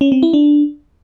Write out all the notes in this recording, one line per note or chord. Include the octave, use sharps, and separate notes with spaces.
C#4
C4
E4
D4